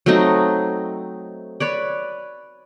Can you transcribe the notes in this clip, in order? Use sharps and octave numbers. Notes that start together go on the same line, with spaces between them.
F#3 A3 C4 D#4
B4 C#5 D5